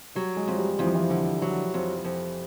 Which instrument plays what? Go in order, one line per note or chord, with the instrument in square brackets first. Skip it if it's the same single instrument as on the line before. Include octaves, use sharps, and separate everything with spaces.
[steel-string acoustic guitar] F#3 [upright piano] G3
[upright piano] G#3
[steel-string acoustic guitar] F2
[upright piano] G3
[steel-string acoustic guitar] F2 [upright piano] E3
[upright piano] F3
E3
[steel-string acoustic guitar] D3
F#3
F2
F2